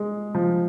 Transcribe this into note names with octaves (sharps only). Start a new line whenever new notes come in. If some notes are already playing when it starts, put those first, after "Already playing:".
Already playing: G#3
F3